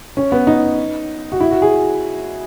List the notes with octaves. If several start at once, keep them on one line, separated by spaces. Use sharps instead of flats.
C#4
B3
D#4
F#4
E4
F#4
G#4